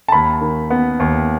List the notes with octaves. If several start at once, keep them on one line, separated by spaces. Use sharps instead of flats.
A5
D#2 B5
D#3
B3
D#2